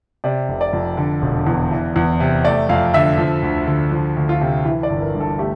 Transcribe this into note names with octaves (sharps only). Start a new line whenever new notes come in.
C3 D5
F1
D5
F2
D3
E1
E2
E3
E2
C3
A3 D5
F2 F5
D3 E5
F3
D2
D3
F3
D2
F4
C3
E3 E4
D5
G1
A#4
G2
A4
A3 G4